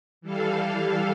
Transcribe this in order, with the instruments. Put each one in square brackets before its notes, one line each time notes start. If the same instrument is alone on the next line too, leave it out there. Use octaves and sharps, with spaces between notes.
[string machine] E3 G3 A4 F5